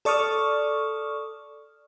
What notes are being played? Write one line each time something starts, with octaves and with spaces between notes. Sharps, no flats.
A4 D5 C#6 D#6 F6